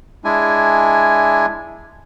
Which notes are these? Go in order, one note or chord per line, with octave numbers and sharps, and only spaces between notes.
G#3 D4 E4 G#5